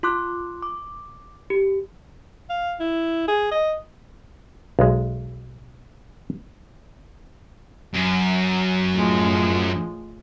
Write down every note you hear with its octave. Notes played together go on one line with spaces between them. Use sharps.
F4 C6 D6 F#6
D6
G4
F5
E4
G#4
D#5
B1 G#3
F#2
A2 F3 G#3